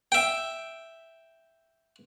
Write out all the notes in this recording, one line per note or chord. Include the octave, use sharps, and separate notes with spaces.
E5 G5